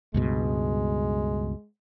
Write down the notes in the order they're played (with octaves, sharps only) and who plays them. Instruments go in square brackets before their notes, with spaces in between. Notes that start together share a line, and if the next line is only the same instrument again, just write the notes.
[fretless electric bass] C#2 G2 B2 [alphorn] G#3